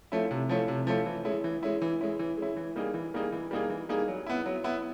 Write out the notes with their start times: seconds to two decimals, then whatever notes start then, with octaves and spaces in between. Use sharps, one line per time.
0.12 F3 A3 C#4 E4
0.31 C3
0.49 F3 A3 C#4 E4
0.68 C3
0.87 F3 A3 C#4 E4
1.06 E3
1.25 G#3 C#4 E4
1.44 E3
1.63 G#3 C#4 E4
1.82 E3
2.01 G#3 C#4 E4
2.19 E3
2.37 G#3 C#4 E4
2.56 E3
2.76 G3 A#3 D#4 G#4
2.94 E3
3.14 G3 A#3 D#4 G#4
3.32 E3
3.51 G3 A#3 D#4 G#4
3.69 E3
3.89 G3 A#3 D#4 G#4
4.08 F#3
4.27 B3 E4
4.46 F#3
4.64 B3 E4